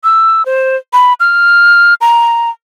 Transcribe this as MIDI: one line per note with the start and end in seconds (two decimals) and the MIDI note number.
0.04 0.45 88
0.46 0.77 72
0.93 1.14 83
1.20 1.94 89
2.01 2.50 82